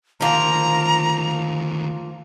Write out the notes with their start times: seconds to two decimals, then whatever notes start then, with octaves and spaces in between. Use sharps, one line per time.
0.21 D2 D#3 F3 A#3 F4 A#5